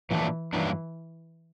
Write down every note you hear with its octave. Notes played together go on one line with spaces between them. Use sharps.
A#2 E3 F#3 A3 D4
G2 D#3 E3 F#3 A#3 D4